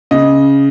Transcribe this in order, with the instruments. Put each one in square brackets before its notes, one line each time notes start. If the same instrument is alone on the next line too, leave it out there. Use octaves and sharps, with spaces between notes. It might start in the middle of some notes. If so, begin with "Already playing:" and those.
[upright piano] C#3 D#5